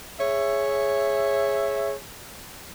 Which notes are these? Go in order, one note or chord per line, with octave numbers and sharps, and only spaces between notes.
G#4 C#5 E5